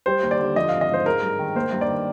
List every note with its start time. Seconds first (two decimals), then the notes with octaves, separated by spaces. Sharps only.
0.06 G3 C5
0.23 D#2
0.31 D5
0.39 D3
0.56 F3 D#5
0.69 G#1 F5
0.81 D#5
0.90 G#2 C5
1.06 G#3 A#4
1.23 G2
1.39 D#3
1.55 A#3 C5
1.72 G2
1.81 D5
1.89 D#3